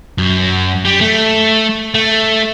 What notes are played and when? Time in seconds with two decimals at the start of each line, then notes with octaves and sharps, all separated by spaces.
0.18 F#2
0.85 G3
1.01 A3
1.94 A3